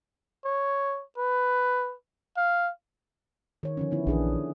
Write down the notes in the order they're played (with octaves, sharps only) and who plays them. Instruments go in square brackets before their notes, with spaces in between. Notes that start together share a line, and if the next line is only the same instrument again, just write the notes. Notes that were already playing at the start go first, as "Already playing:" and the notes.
[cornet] C#5
B4
F5
[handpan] D#3 C#5
D3 F3 C#4
D3 B3 E4
[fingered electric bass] A#1 E3 [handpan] D4 G#4 B4